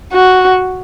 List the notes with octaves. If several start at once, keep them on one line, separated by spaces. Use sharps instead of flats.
F#4